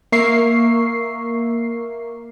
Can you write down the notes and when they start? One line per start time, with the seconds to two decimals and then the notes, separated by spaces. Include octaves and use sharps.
0.12 A#3 A#4 E5 C#6 C7